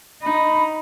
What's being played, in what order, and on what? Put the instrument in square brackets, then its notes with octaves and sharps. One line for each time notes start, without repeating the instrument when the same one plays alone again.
[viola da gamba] D#4 [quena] B5